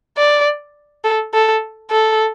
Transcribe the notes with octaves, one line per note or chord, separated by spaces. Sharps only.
D5
A4
A4
A4